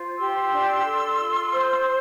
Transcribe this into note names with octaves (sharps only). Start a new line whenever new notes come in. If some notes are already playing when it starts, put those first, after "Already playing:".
Already playing: F4 C5
G4 C6 E6
D4
A4
F4
C5